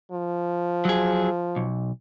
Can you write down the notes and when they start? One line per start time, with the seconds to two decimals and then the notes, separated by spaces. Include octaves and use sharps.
0.11 F3
0.85 F#3 G#4
1.56 B1